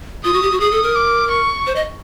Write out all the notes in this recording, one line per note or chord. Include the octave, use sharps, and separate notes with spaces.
F4 D#6
F#4
G4
F#4
G#4 D#6
A4
A#4
D6
C#6
C5
D#5